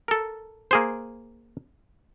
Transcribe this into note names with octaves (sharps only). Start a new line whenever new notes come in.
A4 A#4
A#3 G#4 C5